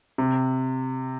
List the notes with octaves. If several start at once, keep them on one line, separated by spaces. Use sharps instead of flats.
C3